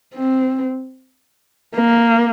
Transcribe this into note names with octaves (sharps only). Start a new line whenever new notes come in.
C4
A#3